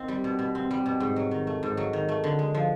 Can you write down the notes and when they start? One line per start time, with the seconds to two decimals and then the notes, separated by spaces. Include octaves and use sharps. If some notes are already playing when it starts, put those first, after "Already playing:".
Already playing: D#3 C4
0.08 G3
0.24 B2
0.39 B2
0.55 C4
0.71 G3
0.86 B2
1.00 G#2
1.16 F#3
1.31 D#3
1.47 A3
1.63 G#2
1.77 F#3
1.93 D#3
2.08 A3
2.24 D3
2.39 G#3
2.55 F3